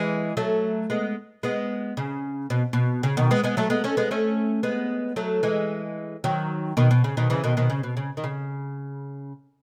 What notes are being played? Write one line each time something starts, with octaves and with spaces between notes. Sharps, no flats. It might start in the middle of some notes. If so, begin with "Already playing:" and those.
Already playing: E3 G#3
F#3 A3
G#3 B3
G#3 B3
C#3
B2
B2
C#3
B2 D#3
G#3 B3
G#3 B3
F#3 A3
G#3 B3
A3 C#4
G#3 B3
A3 C#4
G#3 B3
F#3 A3
E3 G#3
D#3 F#3
B2 D#3
B2
C#3
B2 D#3
C#3 E3
B2 D#3
B2 D#3
C#3
B2
C#3
D#3
C#3